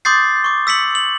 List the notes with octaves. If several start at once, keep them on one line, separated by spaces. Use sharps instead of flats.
C6 D6 D#6 G6 A6 C7
C#6 D6
E6 B6 C#7 F#7
F#7